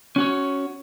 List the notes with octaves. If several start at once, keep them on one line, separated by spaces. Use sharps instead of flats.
C#4 F#4 C#5